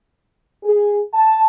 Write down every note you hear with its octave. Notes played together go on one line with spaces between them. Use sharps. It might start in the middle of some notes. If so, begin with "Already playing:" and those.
G#4
A5